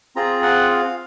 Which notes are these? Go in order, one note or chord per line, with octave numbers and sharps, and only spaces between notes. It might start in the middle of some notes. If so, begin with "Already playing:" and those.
C4 F4 G#4 A#5
F#5
F5